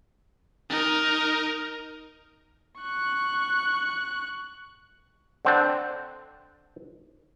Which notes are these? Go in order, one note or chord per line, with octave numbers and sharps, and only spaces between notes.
D#4 A#4
C#6 F#6
D3 C4 D4